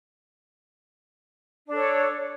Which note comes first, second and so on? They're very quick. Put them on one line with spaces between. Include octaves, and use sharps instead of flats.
D4 A4 C#5